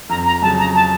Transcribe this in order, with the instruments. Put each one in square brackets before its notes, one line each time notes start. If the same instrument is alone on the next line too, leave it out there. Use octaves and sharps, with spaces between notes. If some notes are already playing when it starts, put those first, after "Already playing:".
[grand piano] F2 [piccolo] A#5
[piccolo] A#5
[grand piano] C#3 F#3 [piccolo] A5
[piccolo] A#5
A5